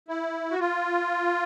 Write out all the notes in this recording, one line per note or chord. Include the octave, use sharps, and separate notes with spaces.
E4
F#4
F4